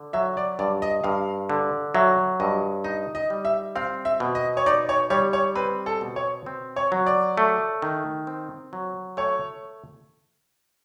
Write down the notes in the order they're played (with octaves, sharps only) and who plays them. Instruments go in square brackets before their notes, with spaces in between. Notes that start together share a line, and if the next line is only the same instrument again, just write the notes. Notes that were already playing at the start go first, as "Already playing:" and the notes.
Already playing: [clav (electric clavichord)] D3
[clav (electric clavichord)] F#3 [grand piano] E5
[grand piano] D5
[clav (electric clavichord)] G2 [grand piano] D5
[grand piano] D#5
[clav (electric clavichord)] G2 [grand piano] F5
[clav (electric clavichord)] D3
[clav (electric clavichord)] F#3 [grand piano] E5
[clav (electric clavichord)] G2 [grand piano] D#5
[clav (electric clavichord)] D#4 [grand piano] D#5
[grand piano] D#5
[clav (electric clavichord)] G3
[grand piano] E5
[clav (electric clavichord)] C4 [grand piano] F5
[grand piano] E5
[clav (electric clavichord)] B2
[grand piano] D#5
C#5
[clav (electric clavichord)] D#4 [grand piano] D5
[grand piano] C#5
[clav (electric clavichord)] G3 [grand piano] C#5
[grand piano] C#5
[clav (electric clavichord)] C4 [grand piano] B4
[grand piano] A4
[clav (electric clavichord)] B2
[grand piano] C#5
[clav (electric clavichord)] C4
[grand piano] C#5
[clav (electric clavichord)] F#3
[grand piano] D5
[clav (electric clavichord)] A3
D#3
C4
F#3
[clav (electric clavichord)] A3 [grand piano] C#5